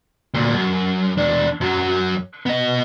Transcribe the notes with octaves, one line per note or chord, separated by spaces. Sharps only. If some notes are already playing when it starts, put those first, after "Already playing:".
D2 A#2
F#2
E2 D4
F#2 F#3
B3 D#5